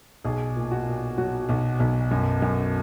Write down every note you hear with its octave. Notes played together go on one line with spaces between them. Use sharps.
B1 G#4
A#2
F#4
A#2
F#3 F#4
B1
B1
F#2
F#2